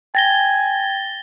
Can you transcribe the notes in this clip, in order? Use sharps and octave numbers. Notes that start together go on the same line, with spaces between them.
G5 G#5 A6 A#6 G7